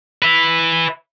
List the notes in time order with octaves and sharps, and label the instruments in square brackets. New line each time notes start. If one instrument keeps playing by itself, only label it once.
[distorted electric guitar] B4 E5